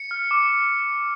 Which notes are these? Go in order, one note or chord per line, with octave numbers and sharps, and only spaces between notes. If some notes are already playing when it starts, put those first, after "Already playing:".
Already playing: C#7
F6
D6
D6